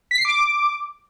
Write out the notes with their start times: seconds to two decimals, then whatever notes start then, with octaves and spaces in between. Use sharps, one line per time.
0.11 B6
0.18 C7
0.25 D6